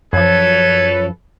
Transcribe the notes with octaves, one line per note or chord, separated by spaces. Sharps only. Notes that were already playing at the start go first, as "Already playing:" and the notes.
F#2 F3 A4 B4 C#5 G#6